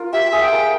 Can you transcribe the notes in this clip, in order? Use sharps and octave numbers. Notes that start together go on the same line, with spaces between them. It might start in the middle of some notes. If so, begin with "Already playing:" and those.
Already playing: F4 A#4
G4 E5
G#4
G5
A#4